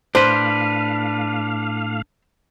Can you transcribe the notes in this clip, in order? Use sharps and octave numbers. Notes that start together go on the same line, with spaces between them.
A2 D4 B4 C5 F5